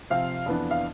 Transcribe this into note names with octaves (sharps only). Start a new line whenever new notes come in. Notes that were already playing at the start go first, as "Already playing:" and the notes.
C3 F3 C4 F5
F2 E3 B3 D4
F5